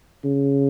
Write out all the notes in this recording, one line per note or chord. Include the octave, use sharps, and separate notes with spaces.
C#3